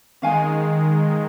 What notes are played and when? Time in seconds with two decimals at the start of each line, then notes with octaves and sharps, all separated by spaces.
0.22 D#3 G#3 C#4 F5 G#5